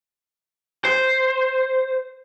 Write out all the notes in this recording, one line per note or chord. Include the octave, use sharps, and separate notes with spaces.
C5